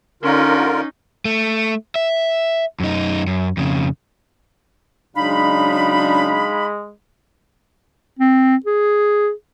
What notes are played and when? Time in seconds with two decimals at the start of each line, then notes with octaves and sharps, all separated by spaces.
0.23 D3 C#4 D#4 F4 A#4
1.25 A3
1.96 E5
2.80 F#2 D#4
3.27 F#2
3.57 F2 C#3
5.16 C#3 F#3 G#3 D4 D#4 F5 B5
8.19 C4
8.66 G#4